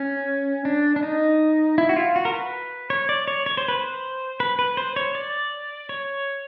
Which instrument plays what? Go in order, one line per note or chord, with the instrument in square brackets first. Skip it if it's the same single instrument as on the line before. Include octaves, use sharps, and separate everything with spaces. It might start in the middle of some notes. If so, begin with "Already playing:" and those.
Already playing: [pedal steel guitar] C#4
D4
D4
D#4
E4
F#4
F4
F#4
A#4
B4
C#5
D5
C#5
C#5
C5
B4
C5
B4
B4
C5
C#5
D5
C#5